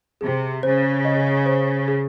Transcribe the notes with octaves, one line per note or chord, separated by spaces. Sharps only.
C3 G#4
C#3 C5
D#5
C5
G#4